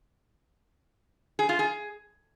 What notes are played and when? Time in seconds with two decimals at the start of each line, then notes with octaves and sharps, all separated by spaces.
1.39 G#4
1.49 F4
1.59 G#4